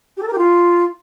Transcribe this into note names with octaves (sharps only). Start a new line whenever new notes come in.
G4
A4
A#4
G4
F4